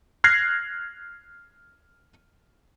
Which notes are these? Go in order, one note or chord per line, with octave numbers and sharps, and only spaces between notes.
F6 F#6 G#6 A#6 C7